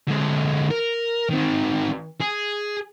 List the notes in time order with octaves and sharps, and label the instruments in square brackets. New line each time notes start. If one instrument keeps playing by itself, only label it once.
[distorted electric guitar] D3 G#3
A#4
D#3 C4
G#4